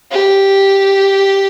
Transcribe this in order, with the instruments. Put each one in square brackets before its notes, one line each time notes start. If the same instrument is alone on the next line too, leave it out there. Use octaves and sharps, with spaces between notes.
[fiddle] G4